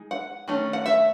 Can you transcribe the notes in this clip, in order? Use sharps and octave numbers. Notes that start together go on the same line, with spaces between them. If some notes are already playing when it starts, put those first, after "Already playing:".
Already playing: G#3 D#4
F#5
D#3 A3 C#4
F#5
E5